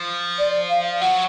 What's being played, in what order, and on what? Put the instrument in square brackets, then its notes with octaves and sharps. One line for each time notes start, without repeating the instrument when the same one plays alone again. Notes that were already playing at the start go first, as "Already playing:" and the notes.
Already playing: [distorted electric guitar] F3
[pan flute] D5
F5
[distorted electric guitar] F#3 [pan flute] F#5